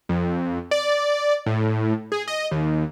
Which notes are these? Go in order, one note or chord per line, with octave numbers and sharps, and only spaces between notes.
F2
D5
A2
G#4
D#5
D#2